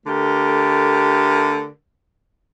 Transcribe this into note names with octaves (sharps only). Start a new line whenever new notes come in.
D3 A3 G4 A#4